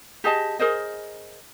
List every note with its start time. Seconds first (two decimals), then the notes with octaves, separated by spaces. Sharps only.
0.24 G4 G#4 D#5 A5
0.59 G#4 A#4 C5 D#5